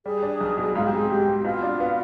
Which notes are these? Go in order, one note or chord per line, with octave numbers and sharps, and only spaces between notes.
G3 G#4
D4
B1
B2
G#2 F4
G4
C4 G#4
G#2 G4
C4
G4
B2 F4
D4
B3